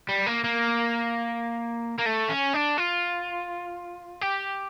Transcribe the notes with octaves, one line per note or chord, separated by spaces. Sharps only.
G3
A#3
A#3
A#3
A3
C#4
D4
F4
G4